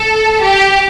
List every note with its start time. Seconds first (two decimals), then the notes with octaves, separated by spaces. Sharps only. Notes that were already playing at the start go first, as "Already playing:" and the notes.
Already playing: A4
0.42 G4